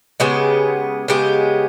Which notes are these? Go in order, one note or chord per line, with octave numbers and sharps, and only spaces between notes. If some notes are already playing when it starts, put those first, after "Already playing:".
C#3 G#3 B3 G4
C#3 G#3 B3 G4